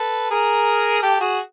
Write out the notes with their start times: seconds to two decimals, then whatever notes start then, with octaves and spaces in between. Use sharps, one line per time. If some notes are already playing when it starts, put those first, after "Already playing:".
Already playing: A4 B4
0.31 G#4 A#4
1.03 G4 A4
1.20 F#4 G#4